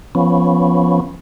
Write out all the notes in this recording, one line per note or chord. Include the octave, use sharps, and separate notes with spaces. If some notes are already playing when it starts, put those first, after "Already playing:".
F3 B3 C#4